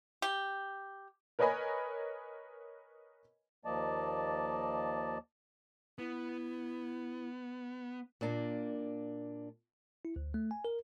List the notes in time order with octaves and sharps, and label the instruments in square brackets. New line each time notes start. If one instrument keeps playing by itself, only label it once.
[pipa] G4
[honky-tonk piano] A#4 B4 C#5 D#5 G#5 B5
[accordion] D#2 F3 A#3 D5 D#5 A5
[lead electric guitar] B3 [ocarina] E4
[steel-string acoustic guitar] A#2 A#3 D4
[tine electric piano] E4
D2
A3
G#5
A#4